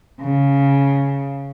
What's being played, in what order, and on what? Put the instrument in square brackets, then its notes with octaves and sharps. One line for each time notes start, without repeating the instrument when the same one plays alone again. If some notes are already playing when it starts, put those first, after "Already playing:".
[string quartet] C#3